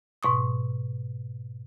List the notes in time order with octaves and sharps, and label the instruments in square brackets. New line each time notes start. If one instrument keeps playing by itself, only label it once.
[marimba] G#2 B2 C#6 D#6